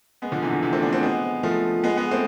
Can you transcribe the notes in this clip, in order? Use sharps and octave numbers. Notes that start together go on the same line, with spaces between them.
G#3 B3
D3 F3
C3 E3
D3
C3 E3
A3 C4
B3 D4
A3 C4
G#3 B3
F3 A3
G#3 B3
G#3 B3
A3 C4